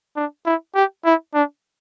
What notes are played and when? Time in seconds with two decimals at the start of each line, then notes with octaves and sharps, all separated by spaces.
0.16 D4
0.46 E4
0.75 G4
1.05 E4
1.34 D4